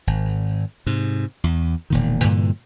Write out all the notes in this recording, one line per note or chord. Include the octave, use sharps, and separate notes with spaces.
G#1
G#2 C3
E2
E1 A#2 D#3
G2 A#2 D3 E3